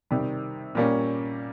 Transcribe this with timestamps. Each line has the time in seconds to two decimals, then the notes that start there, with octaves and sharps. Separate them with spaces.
0.11 C3 D#3 G3
0.75 A#2 G3 A#3 C#4